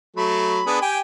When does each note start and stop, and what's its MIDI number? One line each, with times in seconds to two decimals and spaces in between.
0.16 0.61 54
0.16 0.61 57
0.16 0.82 83
0.66 0.78 59
0.66 0.78 62
0.66 0.78 68
0.81 1.00 67
0.81 1.00 79
0.81 1.00 80